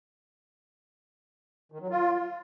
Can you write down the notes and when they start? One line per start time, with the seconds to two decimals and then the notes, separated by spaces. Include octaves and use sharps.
1.72 D#3
1.81 F#3
1.90 F4